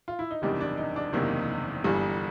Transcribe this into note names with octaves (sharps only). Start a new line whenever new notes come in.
F4
E4
D#4
F#1 E2 C3 D#3 G3 D4
D4
D#4
D4
F#1 E2 C3 D#3 G3 A#3
G1 G2 E3 G3